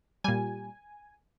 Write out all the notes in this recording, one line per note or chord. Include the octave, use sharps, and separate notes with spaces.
A#2 G3 G#5